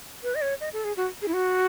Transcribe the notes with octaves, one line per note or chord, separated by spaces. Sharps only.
B4
D#5
C#5
D#5
A4
G#4
F#4
G#4
E4
F#4